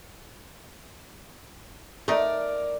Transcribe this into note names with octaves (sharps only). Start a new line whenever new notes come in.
A3 D#4 A#4 D5